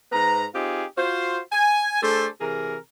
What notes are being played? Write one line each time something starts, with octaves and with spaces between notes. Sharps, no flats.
G#2 B4 A#5
C4 D#4 F4 G4 G#4
F4 F#4 C5
G#5
A3 D4 G#4 A4 C5
C3 E3 G#4 A#4